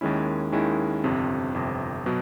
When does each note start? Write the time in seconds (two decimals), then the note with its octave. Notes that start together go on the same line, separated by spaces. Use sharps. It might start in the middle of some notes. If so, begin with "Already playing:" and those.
0.01 D#2 D#3 G#3 C#4 E4
0.52 D#2 D#3 G#3 C#4 E4
1.04 G1 F2 C3
1.54 G1 F2 C3
2.06 B2 F#3